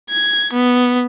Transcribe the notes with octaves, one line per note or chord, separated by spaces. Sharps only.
G#6
B3